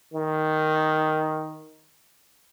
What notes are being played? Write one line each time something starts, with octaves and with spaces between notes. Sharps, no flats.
D#3